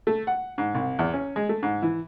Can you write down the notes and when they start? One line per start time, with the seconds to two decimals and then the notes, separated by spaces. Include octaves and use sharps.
0.07 A3
0.27 F#5
0.58 G#2
0.75 C2
0.99 E2
1.14 C#4
1.36 G#3
1.49 A3
1.63 G#2
1.82 E3